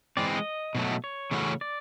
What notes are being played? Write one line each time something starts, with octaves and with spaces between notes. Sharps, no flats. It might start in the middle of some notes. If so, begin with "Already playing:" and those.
E3 G#3 C4 D5
D#5
B2 F#3 A3
C#5
C#3 E3 A3 C#4 F#4
D5